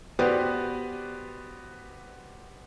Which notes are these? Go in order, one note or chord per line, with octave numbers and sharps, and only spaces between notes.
B3 F#4 G4 B4 C5 D5